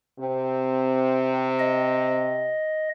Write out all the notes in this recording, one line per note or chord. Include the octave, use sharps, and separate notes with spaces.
C3 C4
D#5